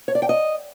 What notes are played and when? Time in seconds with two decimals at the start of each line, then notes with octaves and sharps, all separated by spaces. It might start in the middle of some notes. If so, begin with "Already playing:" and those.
0.08 C#5
0.15 D5
0.22 G5
0.29 D#5